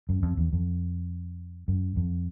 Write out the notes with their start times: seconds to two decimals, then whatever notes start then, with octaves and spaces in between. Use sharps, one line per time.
0.09 F#2
0.23 F2
0.37 E2
0.53 F2
1.68 F#2
1.96 F2